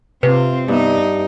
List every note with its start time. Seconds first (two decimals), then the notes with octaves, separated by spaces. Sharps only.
0.23 C3 C4 F4 B4
0.68 G2 B3 D#4 E5